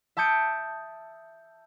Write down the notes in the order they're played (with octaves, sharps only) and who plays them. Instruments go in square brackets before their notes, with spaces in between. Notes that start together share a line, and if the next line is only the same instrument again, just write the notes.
[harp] E5 A5 D#6 G6 C#7 D7